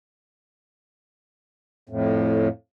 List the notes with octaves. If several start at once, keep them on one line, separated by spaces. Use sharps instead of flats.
F2 A2